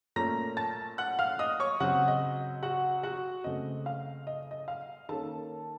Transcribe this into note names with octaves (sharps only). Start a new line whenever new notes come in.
A#2 A3 C#4 A#5 A#6
A5 A6
F#5 F#6
F5 F6
D#5 D#6
C#5 C#6
C#3 F#3 C4 F#4 F#5
D#5
F#4 F#5
F#4 F#5
C#3 A3 C4 D#5
F5
D#5
D#5
F5
D#3 A#3 C#4 A4 A5